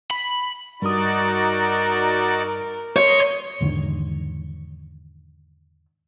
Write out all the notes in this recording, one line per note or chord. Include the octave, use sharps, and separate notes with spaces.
B5
G2 D#4 F#4 A#4 D5 D#6
C#5 D#5 C6
E2 G#2 D3 D#3